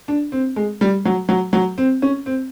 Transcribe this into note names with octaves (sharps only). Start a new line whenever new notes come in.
D4
C4
G#3
G3
F#3
F#3
F#3
C4
C#4
C4